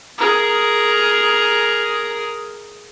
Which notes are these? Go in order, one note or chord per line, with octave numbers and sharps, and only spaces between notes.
G#4 A#4